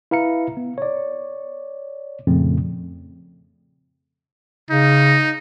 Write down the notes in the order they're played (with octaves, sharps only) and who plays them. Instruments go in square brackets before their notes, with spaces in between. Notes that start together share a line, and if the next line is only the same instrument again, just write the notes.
[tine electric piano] E4 B4 F5 A#5 C#7
B3
C#5 D5
F2 A#2 C#3 F3 A3 C4
[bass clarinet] C#3 [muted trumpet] D#4